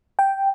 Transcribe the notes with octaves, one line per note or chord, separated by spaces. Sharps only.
G5